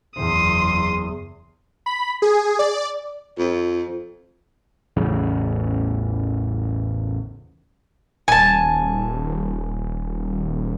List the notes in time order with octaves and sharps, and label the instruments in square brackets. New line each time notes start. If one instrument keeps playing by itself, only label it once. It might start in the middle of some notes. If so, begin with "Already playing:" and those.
[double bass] F#1 E2 [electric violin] C6 D#6
[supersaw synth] B5
G#4
D5
[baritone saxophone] F2
[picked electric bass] A1 E2 C#3
[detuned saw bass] D#1 [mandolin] G#5 A5